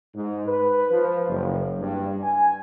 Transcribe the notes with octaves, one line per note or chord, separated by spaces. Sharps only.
G#2
B4
F3
F#1
G2
G#5